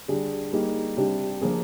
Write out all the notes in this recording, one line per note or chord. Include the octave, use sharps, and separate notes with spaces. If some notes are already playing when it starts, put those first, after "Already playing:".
D3 G3 D4 G#4
G3 A#3 D#4 G#4
C3 G3 D4 G4
F3 A#3 D4 G#4